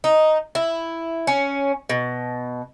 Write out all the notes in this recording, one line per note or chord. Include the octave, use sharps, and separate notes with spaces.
D#4
E4
C#4
B2